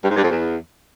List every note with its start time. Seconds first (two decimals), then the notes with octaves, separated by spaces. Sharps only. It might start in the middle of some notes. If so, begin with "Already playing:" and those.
0.03 G2
0.10 G#2
0.17 G2
0.23 F2
0.30 E2